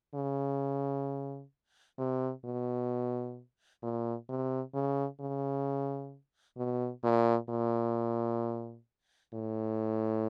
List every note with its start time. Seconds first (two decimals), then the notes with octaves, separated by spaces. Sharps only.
0.15 C#3
1.98 C3
2.44 B2
3.83 A#2
4.29 C3
4.74 C#3
5.20 C#3
6.57 B2
7.04 A#2
7.49 A#2
9.34 A2